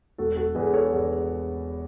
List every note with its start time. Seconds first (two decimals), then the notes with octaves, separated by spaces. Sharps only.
0.18 E1 F#4 A4
0.36 F#4 A4
0.55 E2 G#4 B4
0.73 A4 C#5
0.92 E2